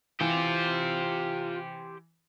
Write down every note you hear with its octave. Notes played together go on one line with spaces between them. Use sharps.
E3 F4 G4 C5